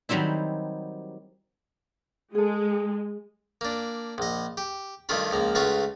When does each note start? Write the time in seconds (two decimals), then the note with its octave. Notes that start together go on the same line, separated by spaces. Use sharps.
0.09 D#3 F#3 G3 C4 E4
2.35 G#3 G#4 A4
3.61 A#3 D4
4.18 A#1 D#5
4.57 G4
5.09 G2 D#3 A3 F4 B5
5.31 C#2 F3 A#3
5.55 C#2 A3 F4 F#4 B4